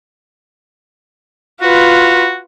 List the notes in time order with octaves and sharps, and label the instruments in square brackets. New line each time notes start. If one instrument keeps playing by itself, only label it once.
[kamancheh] F4 B4 [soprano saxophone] F#4